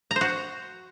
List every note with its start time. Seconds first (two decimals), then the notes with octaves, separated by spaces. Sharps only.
0.11 A#5
0.16 C5
0.21 F#4